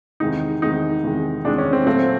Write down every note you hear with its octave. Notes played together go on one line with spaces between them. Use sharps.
E2 C3 D#3 G#3 D#4
E2 C3 D#3 G#3 D#4
E2 C3 D#3 G#3
E2 C3 D#3 G#3 D4
C#4
C4
A#2 F#3 A3 C4